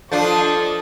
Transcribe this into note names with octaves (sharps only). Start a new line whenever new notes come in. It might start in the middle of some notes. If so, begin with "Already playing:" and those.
F3 D4 F4 A4 D#5 A5 D6